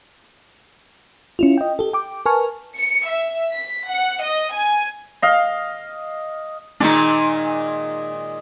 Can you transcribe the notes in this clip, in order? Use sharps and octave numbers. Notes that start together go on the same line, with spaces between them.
C#4 E4 F4
D#5 G5
G4 A4
G5 D6
A#4 B4 G#5 A5 C#6 F6
C#7
E5
B6
F#5
D#5
G#5
D#5 F5
A#2 D#3 G#3 D4 D#4